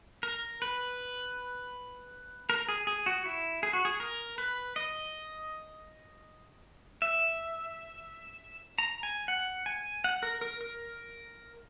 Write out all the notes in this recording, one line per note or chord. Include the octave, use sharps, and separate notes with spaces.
A#4
B4
A#4
G#4
G#4
F#4
E4
G#4
F#4
G#4
A#4
B4
D#5
E5
A#5
G#5
F#5
G#5
F#5
A#4
A#4
A#4